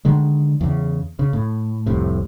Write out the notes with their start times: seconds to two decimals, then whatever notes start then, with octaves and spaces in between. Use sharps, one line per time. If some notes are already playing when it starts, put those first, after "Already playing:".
0.05 D3 D#3 G#3
0.61 E2 C#3
1.19 C#3
1.33 A2
1.86 F1 C2 A2 C3